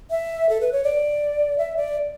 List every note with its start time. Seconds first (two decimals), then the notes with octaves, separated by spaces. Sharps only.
0.10 E5
0.49 A4
0.61 B4
0.73 C#5
0.84 D5
1.58 E5
1.77 D5